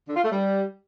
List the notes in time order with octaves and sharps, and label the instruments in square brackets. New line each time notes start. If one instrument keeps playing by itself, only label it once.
[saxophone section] D3
F4
A3
G3